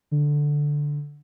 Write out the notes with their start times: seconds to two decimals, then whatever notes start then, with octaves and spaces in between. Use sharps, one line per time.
0.11 D3